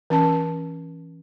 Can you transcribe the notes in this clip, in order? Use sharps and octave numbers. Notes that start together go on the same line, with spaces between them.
E3 C#4 A5